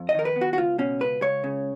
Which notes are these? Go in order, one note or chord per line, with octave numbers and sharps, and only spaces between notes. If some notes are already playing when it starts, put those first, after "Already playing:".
Already playing: F2
D#5
D#3 A#4
B4
B3
F#4
F#4
C#2 F4
B2 C#4
C#2 B4
C#2 C#5
C#3